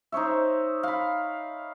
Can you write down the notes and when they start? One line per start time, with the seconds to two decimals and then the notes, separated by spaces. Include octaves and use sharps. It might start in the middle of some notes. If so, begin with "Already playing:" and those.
0.12 D#4 C5 C#5 E5
0.83 F5 B5